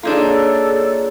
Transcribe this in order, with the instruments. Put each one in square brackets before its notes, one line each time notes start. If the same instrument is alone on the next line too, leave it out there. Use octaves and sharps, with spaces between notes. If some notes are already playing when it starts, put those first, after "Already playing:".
[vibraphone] A#3 G#4 C#5 [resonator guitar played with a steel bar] D4 D#4 F4 [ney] A4